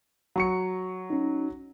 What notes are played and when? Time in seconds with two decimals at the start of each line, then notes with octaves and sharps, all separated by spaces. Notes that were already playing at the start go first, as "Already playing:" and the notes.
0.36 F#3 C#6 C#7
1.10 C#4 D#4